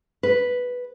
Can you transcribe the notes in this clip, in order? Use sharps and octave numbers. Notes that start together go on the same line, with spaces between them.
B4